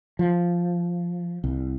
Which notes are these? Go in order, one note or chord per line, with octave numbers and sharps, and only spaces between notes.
F3
C2